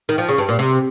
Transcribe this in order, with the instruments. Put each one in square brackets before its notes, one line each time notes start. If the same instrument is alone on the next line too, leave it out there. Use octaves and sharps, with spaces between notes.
[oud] D#3
F3
C#3
G2
A#2
C3